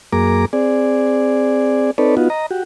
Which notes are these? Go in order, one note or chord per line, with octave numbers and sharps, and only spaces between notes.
F#2 A#3 G#4 A#5 D6
C4 G#4 D5
C4 D#4 A4 B4 C#5 D5
B3 D#4 F4 F#4
D#5 A#5
F#4 G4